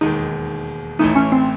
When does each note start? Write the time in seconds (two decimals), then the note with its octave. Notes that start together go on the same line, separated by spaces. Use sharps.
0.01 E1 D#2 D#3 G#3 D#4
0.99 A1 A2 E3 A3 D#4
1.16 C#4
1.32 C4